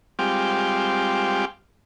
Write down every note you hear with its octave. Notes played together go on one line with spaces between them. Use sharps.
G3 G#3 C4 F4 G4